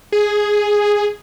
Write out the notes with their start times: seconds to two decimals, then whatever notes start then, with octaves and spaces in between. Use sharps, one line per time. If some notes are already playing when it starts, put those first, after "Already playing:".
0.12 G#4